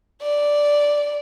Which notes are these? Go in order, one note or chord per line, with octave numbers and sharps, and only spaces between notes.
D5